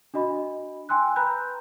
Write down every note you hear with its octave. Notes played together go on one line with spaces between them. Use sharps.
D4 F#4 D#5 B5
G5 G#5 C6 E6 F#6
B4 A#5 B5 F#6 G6